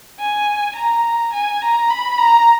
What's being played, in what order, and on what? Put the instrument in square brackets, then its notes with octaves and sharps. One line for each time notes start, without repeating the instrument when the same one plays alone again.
[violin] G#5
A#5
G#5
A#5
B5
A#5